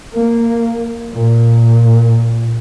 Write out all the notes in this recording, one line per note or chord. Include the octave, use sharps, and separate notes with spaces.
A#3
A#2